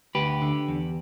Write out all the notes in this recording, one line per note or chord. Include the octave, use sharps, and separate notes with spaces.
D2 G4 B4
D3
E2